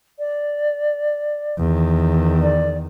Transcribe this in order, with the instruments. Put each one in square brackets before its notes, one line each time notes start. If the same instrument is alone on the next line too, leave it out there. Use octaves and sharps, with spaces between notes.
[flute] D5
[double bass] E2 D#3
[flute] D5